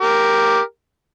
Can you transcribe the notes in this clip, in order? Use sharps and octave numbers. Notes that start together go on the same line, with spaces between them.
G4 A#4